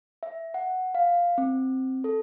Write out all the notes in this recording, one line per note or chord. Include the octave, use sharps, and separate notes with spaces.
E5
F#5
F5
C4
A4